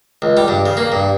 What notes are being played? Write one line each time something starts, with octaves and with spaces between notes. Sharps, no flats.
C#2
G3
G2
C#3
A#3
G2